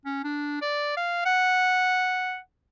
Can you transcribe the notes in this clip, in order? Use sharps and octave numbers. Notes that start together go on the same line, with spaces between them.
C#4
D4
D5
F5
F#5